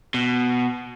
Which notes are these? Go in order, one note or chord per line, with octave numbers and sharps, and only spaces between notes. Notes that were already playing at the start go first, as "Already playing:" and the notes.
B2